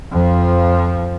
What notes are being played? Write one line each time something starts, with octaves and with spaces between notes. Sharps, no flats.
F2 F3